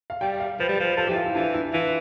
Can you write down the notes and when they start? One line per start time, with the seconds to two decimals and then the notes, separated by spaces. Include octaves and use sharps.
0.10 F5
0.21 G3 G5
0.40 F5
0.60 F3 B4
0.69 G3
0.78 F3 B4
0.97 F3 A4
1.07 G4
1.10 E3
1.16 F4
1.26 E4
1.35 E3 D4
1.54 E4
1.73 E3 F4